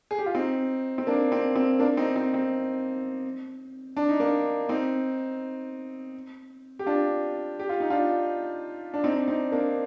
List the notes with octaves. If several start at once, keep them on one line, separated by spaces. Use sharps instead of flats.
G#4
G4
F4
C4 D#4
C4
A#3 D4
C4
C4
A#3 D4
C4 D#4
C4
C4
D4
D#4
A#3 D4
C4 D#4
G4
D4 F4
G4
F4
D#4
D4 F4
D4
C4 D#4
D4
C4 D#4
A#3 D4